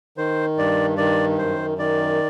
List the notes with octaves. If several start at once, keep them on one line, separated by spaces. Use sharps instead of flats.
D#3 C5
G2 D5
D#3 D5
F#2 C5
D#3 D5